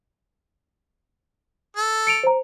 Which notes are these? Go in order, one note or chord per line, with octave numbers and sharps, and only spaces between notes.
A4
C#7 D7 F7
C5 A#5